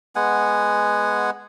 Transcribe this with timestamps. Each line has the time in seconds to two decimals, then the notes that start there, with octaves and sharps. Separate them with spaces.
0.16 G#3 B3 F#5 G#5